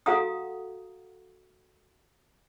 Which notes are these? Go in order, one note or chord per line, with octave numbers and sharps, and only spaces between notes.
F#4 A4 F5 F#5 A#5 D#6